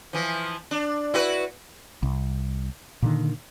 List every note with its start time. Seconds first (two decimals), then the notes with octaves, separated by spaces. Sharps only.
0.13 E3 F3
0.71 D4
1.14 E4 F#4 B4
2.03 C2
3.02 A#2 D3 D#3